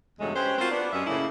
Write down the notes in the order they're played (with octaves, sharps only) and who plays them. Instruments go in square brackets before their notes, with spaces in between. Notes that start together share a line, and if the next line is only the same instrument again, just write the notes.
[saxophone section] E2 G2 C#3 F#3 G#3 A3
C#4 G4 B4 C5
C4 F4 F#4 A#4 C5
B3 D4
F#2 C#4 G4 D#5 E5
A2 C#3 A3 A#3 C#4 E4